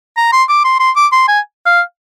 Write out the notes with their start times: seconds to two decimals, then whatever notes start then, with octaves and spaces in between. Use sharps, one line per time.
0.17 A#5
0.32 C6
0.49 D6
0.64 C6
0.80 C6
0.96 D6
1.12 C6
1.28 G#5
1.66 F5